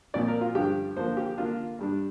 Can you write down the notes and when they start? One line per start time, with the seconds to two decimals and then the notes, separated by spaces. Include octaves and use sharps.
0.14 A#2 F3 C4 D5
0.28 A#4
0.41 F4
0.55 G2 D3 F3 D4 G4
0.97 D3 F3 A#3 D4 C5
1.17 G4
1.38 D3 A#3 D4 F4
1.79 G2 G3 D4